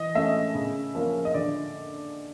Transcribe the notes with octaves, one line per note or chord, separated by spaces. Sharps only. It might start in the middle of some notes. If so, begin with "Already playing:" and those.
Already playing: E3 D#5
A3 C#4 E5
C#3
F3 A#3 C#4
D#5
D3 D5